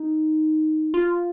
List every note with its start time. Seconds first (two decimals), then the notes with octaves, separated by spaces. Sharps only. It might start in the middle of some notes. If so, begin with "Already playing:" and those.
Already playing: D#4
0.94 F4